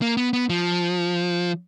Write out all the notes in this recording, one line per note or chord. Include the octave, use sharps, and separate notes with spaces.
A#3
B3
B3
F3